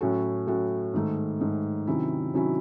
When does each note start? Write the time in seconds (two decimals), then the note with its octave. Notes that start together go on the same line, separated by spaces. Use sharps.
0.01 A2 F#3 C#4 F#4 A4
0.47 A2 F#3 C#4 F#4 A4
0.94 G#2 D#3 A3
1.41 G#2 D#3 A3
1.87 C3 D#3 F#3 C#4 E4
2.33 C3 D#3 F#3 C#4 E4